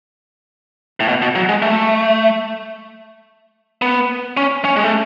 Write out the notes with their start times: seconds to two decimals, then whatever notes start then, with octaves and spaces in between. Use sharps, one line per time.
1.00 A2
1.08 B2
1.22 B2
1.35 F#3
1.49 G#3
1.62 A3
3.82 B3
4.37 C#4
4.65 C#4
4.76 G#3
4.84 A3